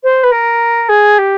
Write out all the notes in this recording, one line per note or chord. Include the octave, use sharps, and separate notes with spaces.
C5
B4
A#4
G#4
G4